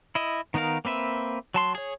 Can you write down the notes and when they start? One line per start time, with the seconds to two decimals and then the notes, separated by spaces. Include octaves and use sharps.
0.15 E4 D#5
0.54 D#3 B3 D#4 A#4 F5
0.85 A#3 C4 B4 E5
1.54 F#3 A5 C6
1.75 G#4 C#5